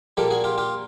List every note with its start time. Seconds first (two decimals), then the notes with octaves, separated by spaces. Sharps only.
0.17 A#1 A#2 G3 A#3 G4 A4
0.30 F#4 G#4
0.44 F4 G4
0.58 F4 G4